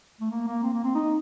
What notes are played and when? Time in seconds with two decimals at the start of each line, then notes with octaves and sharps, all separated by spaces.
0.21 A3
0.31 A#3
0.47 A#3
0.63 C4
0.73 A#3
0.84 C4
0.95 D#4